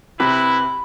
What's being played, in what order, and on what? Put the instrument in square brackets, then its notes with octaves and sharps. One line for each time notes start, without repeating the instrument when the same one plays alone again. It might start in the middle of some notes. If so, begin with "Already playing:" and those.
[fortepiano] C3 [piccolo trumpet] E4 [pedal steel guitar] B4 [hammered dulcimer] B5